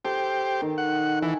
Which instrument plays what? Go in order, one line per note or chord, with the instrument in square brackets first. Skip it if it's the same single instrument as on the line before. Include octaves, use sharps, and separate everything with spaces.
[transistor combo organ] G4 C5 [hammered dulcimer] A4
[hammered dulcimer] D#3
[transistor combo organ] F#5
[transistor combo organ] E3 [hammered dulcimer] G#5